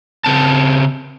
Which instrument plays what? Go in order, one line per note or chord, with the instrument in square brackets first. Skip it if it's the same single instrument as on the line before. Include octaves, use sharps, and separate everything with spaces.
[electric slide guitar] C#3 C4 A5